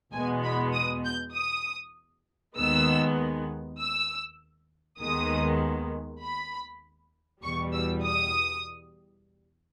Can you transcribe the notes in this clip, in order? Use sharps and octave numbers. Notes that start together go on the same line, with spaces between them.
E2 B2 G#3 B3 G#5
B5
D#6
G6
D#6
D#2 D#3 G#3 B3 E6
E6
D#2 D#3 G#3 B3 D#6
B5
E2 B2 G3 C#6
E6
D#6